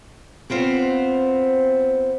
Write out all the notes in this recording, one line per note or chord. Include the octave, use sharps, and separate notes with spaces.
B3 C4 F4 C5